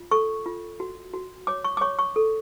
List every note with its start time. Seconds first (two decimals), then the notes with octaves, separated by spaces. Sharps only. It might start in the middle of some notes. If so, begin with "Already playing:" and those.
Already playing: F4
0.11 A4 C#6
0.46 F4
0.80 F#4
1.14 F#4
1.47 C#5 D6
1.64 C#6
1.77 D6
1.81 C#5 C#6
1.99 C#6
2.16 A4